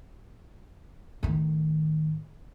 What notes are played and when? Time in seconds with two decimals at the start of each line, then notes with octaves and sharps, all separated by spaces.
1.23 A2 D#3